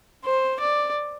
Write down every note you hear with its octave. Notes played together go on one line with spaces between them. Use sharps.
C5
D5